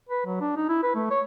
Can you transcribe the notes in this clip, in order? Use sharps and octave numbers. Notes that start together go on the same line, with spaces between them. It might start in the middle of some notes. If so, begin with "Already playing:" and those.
B4
F#3
D4
D#4
E4
B4
A3
C#5